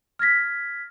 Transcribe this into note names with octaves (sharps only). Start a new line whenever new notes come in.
F6 G#6 A#6 B6